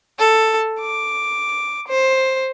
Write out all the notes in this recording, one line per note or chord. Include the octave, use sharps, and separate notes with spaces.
A4
D6
C5